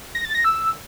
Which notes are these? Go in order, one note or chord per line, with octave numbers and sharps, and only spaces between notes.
A#6
A6
A#6
E6